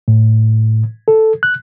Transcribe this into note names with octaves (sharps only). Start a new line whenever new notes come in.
A2
A4
F#6